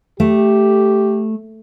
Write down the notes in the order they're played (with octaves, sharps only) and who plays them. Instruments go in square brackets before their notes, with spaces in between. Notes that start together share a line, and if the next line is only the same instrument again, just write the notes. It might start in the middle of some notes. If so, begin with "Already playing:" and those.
[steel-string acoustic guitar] A3 [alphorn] G4